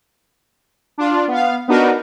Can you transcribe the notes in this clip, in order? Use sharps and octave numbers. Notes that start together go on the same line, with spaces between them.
D4 F4
B3 F5
B3 D4 D#4 F#4 A#4